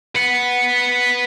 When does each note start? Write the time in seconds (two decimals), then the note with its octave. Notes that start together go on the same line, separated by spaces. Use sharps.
0.15 B4 F#5